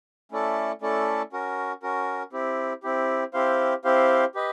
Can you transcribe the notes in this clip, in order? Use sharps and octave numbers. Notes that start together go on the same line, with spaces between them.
A3 C#4 E4 A4 D5
A3 C#4 E4 A4 D5
C#4 F#4 A#4
C#4 F#4 A#4
C4 E4 G4
C4 E4 G4
C4 E4 G4 C5 F5
C4 E4 G4 C5 F5
G4 B4 D#5